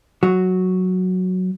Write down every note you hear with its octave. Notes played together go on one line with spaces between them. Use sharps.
F#3 F#4